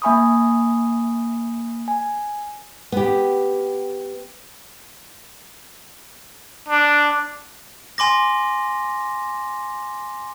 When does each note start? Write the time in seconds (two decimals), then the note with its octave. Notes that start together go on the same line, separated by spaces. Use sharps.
0.02 A#3 E5 G#5 B5 C#6 D#6
1.88 G#5
2.92 B3 G4
6.68 D4
7.98 G#5 C6 D6 A#6